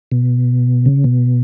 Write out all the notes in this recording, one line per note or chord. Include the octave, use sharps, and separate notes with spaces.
B2
C#3
B2